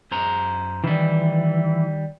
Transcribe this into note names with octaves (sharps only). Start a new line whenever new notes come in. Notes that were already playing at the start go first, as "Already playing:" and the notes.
F#2 C5 A#5
D#3 E3 G3